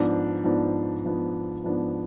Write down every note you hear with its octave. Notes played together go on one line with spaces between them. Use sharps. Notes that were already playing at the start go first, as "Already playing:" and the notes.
Already playing: G#2 F3 B3 D4
G#2 F3 B3 D4
G#2 F3 B3 D4
G#2 F3 B3 D4